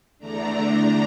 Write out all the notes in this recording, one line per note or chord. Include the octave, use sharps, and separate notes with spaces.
E2 D3 A3 D4 A#5